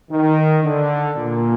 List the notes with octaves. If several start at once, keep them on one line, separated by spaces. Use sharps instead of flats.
D#3
D3
A#2